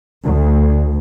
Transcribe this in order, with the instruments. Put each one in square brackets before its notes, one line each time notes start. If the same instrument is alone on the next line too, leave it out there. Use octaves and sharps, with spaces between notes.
[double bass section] D2